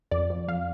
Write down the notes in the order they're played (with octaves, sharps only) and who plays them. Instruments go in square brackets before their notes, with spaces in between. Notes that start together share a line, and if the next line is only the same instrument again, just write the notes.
[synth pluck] F2 D5
F2
F2 F5